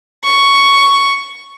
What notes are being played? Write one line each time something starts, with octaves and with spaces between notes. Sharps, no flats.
C#6